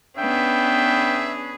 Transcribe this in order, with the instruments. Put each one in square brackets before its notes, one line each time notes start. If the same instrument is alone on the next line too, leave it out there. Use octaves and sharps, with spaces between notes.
[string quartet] B3 C#4 D4 [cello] G#4 B4 [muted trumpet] E5 [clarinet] G5